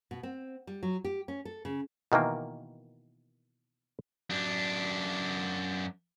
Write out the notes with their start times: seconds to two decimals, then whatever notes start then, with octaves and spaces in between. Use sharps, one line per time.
0.11 B2
0.23 C4
0.67 G3
0.83 F#3
1.05 G4
1.28 C#4
1.45 A4
1.65 C#3
2.12 B2 D#3 E3 A#3
4.30 F#2 D4